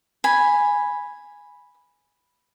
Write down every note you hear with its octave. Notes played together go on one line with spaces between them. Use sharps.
G#5 B5